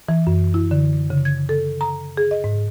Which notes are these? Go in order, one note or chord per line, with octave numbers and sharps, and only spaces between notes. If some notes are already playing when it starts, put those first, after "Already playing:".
E3
F#2
E4
D3
C#3
G#6
A4
A#5
G#4
D#5
G#2